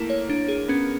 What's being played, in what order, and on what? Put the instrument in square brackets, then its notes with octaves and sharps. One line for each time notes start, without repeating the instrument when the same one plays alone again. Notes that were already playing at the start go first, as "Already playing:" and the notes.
Already playing: [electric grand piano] A3 A#3 [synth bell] E4
[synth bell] C#5
D4
G#4
[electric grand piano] B3 [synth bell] C#4